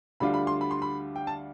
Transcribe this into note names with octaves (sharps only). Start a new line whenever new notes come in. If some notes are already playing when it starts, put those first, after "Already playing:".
D2 D3 G3 D4 F4 B5
B5
C6
B5
C6
B5
G5
A5